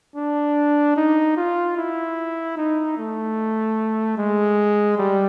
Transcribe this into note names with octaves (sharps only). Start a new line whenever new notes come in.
D4
D#4
F4
E4
D#4
A3
G#3
G3